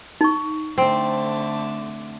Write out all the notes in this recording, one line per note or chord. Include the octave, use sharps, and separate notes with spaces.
D#4 C#6
D3 A3 C4